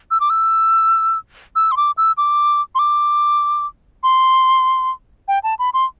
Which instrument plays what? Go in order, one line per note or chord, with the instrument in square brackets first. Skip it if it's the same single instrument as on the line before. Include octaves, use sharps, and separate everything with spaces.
[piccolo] E6
D6
E6
E6
C6
D6
E6
D6
C6
D6
C6
G5
A5
B5
C6